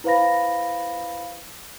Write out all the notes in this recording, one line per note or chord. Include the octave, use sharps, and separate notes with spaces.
E4 B4 C5 F5 B5 A#6